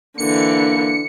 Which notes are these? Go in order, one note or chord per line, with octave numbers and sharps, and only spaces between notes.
D3 E3 A#3 D4 C#7